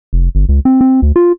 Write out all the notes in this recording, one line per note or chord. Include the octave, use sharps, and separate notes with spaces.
F1
G1
C#2
C4
C4
D2
F4